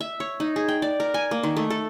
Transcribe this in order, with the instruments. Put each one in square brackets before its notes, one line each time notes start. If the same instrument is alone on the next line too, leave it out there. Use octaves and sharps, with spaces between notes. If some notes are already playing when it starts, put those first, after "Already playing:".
[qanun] E5
C#5
D#4
G#4
G5
D5
A#4
G#5
A#3
D#3
A3
A4